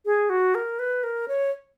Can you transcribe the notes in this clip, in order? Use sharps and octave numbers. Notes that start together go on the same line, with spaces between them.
G#4
F#4
A#4
B4
A#4
C#5